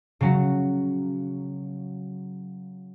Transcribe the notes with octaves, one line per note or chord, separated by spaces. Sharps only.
C#3 F#3 F#4